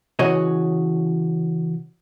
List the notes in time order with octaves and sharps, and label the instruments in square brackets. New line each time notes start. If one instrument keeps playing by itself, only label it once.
[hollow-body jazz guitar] C#3 E3 F#4 C#5 D#5